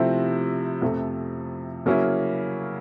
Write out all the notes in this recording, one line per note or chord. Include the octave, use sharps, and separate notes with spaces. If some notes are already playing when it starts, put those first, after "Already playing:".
Already playing: C3 F3 A3 C4 E4
F2 C3 F3 A3
C#3 F#3 A#3 C#4 E4